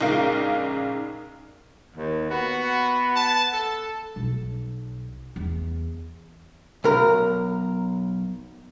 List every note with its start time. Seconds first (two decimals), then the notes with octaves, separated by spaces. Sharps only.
0.01 A#1 C#3 G#3 D#4 A#4 F5
1.96 D#2
2.30 B3 F#4
3.16 A5
3.53 A4
4.16 B1
5.36 E2
6.84 B1 A#4 A#5